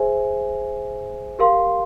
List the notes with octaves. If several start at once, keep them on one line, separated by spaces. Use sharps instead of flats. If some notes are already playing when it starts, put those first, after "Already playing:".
Already playing: G#4 C5 E5 G#5
G4 A#4 F5 C6